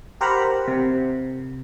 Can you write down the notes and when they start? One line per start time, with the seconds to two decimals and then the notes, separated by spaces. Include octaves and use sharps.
0.21 G4 A#4 C5 F#5 A#5 B5
0.68 C3